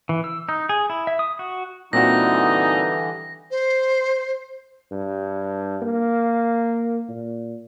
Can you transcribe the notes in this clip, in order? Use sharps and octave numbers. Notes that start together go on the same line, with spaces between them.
E3
E6
D#4
G#4
E4
E5
D#6
F#4
A#2 D3 E3 G3 C4 D#4 F#4 A#6
C5
G2
A#3
A#2